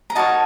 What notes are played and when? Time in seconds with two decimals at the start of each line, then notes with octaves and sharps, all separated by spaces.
0.10 A#5
0.15 D#4 F#4 A#4 C#5 A5